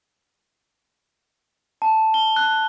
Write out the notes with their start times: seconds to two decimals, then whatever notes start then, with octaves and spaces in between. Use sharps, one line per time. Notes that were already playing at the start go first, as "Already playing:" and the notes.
1.82 A5
2.14 G7
2.36 F#6